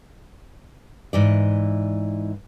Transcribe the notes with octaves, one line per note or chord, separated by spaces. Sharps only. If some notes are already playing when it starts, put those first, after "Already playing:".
G#2 E3 D5